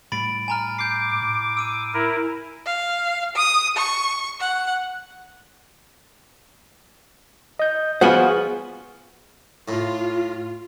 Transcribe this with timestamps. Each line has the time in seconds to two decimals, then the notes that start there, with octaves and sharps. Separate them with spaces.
0.12 A2 G3 B5 A6 D7
0.48 G#5 A#5 F6
0.78 D6 G6 C7
1.22 A2
1.57 E6 D7 D#7
1.94 E4 A#4
2.66 F5
3.35 D#6
3.76 C#6
4.40 F#5
7.59 D#5 G6
8.01 F3 B3 F4 F#4 G#4 C5 F#5 G#5
9.68 A2 F4